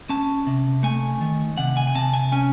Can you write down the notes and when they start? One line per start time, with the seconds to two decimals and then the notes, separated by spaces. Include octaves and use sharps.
0.09 C#4 A5
0.47 C3
0.83 A3 G#5
1.21 D#3
1.58 C3 F#5
1.77 G#5
1.87 G#5
1.95 C3 A5
2.13 G#5
2.32 C#4 G#5